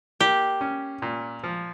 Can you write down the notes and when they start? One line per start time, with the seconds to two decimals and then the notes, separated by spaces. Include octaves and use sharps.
0.20 A#3 G4
0.61 C#4
1.02 A#2
1.44 F3